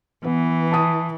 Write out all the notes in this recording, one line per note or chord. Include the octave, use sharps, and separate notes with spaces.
E3 B3
A5 D#6